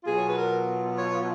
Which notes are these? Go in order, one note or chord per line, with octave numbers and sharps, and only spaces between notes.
B2 F#3 B3 F4 G#4
C#5
B4
A#4
C#5